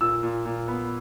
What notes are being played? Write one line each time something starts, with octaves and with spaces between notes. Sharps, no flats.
A#2 E6
A#2
A#2
B3